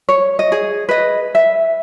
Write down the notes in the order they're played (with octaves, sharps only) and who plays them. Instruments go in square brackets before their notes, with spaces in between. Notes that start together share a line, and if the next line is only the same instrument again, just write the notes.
[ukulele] C#5
D#5
G#4
B4 D#5
E5